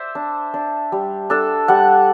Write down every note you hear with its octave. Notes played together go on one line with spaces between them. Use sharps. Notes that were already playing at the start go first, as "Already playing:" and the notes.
Already playing: C5 D5 E5
D4
D4
G3
D4 A4
G3 F#5